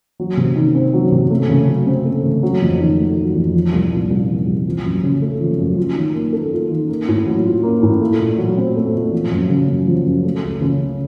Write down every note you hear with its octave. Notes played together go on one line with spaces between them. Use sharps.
F#3
C3
D#3
C4
F#3
C3
A3
C#3
F#3
C4
A3
C#3
F#3
F2
D#3
A3
F#3
F2
F3
C2
A#2
C2
F3
C2
F3
F#2
C#3
A3
F3
F#2
F4
D#3
A#3
A4
F4
D#3
A#3
A2
F#3
F4
A#3
A2
A3
A#2
F#3
C4
A3
A#2
F3
F#2
C#3
F#2
F3
F#2
A3
C#2
C#3
C#4